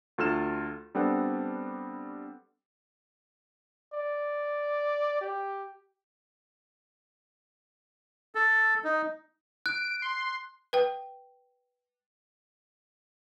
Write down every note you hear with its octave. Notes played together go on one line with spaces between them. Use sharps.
D2 F4 A4 F6 E7
G3 B3 C4 D4 A4 F#5
D5
G4
A4
D#4
F#6 D7
C6
B4 G5